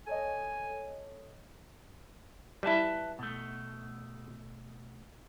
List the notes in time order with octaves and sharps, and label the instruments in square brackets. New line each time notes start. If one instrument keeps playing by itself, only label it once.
[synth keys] A4 C#5 D#5 [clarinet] G#5
[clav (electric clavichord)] G3 E4 [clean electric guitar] B4 E5 A5
[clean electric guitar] B2 A3